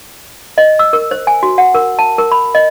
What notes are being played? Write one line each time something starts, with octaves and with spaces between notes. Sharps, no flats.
D#5
E6
A#4
C5
G#5
F#4
F#5
A#4
A5
A#4
B5
D#5